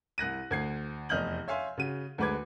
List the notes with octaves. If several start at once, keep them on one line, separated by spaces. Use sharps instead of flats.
C2 F#6 A#6 D#7
D2 G#6 C7
F1 E2 D#5 F6 G6 F#7
C#5 E5 F5 G#5 C6
C#3 F#4 D#7
D2 G#3 B4 D6 G#6